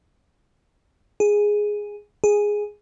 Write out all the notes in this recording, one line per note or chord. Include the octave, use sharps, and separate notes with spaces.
G#4
G#4